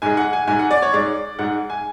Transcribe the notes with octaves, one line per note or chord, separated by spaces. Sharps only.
G#2 G#3 G#5
F#5
G#5
G#2 G#3 G#5
F#5
D5
C#5
G#2 G#3 D5
G#2 G#3 F#5
G#5